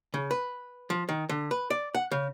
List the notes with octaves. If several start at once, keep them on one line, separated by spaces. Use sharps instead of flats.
C#3
B4
F3
D#3
D3
B4
D5
F#5
C#3